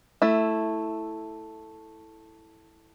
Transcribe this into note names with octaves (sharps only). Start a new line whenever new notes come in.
A3 E4